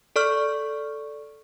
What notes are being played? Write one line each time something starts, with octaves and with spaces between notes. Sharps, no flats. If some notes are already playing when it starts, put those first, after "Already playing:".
A4 D5 C#6 F6